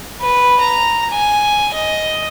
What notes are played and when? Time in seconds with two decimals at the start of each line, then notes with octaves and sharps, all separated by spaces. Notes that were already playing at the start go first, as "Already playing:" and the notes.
0.21 B4
0.61 A#5
1.11 G#5
1.74 D#5